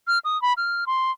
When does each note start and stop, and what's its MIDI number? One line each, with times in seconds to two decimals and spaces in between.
0.07 0.19 89
0.24 0.40 87
0.42 0.53 83
0.57 0.84 89
0.87 1.11 84